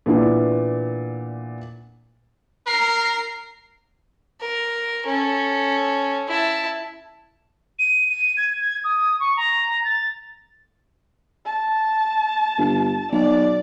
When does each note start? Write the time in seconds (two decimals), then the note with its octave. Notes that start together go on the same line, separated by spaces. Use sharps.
0.06 A#2 E3 B3 D4 E4
2.67 A#4 A#5 C7
4.41 A#4
5.06 C#4 A4
6.28 E4 A5
7.79 D#7
8.10 D#7
8.37 G#6
8.60 G#6
8.84 D#6
9.20 C#6
9.37 A#5
9.85 A6
11.45 A5
12.58 G1
13.12 B1 D5